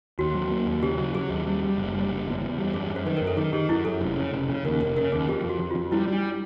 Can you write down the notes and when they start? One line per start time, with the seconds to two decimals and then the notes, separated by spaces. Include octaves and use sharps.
0.19 D#2 F#4
0.34 F#3
0.51 A#3
0.67 D#2
0.82 C#3 G4
0.98 F#3
1.14 F#3 G#4
1.30 D#2
1.46 G3
1.63 G3
1.78 F#1
1.94 G3
2.10 F#1
2.26 E2
2.41 E2
2.58 G3
2.73 F#2 G#4
2.90 F#2
2.96 C5
3.05 D#3 B4
3.17 F#2 A#4
3.27 A4
3.37 D#3 G#4
3.53 D#3 G4
3.69 F#2 E4
3.85 F#2 A4
4.01 F1
4.17 C#3
4.33 F1
4.49 C#3
4.65 D#2 A#4
4.81 F1 A#4
4.97 C#3 A#4
5.12 D#2 G#4
5.29 F2 G4
5.44 F2
5.49 F#4
5.60 F2
5.71 F2 F4
5.92 G3 E4
6.07 G3
6.13 D4